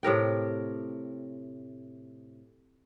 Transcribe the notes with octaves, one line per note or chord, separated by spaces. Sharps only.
A2 C3 A#4 G5